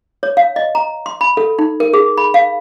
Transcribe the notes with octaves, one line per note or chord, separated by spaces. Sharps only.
C#5
F5
D#5
A#5
C6
B5
A4
D#4
A#4
G#4
B5
F5